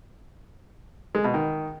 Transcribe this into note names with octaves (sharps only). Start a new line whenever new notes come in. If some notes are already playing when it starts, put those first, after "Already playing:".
G#3
B2
D#3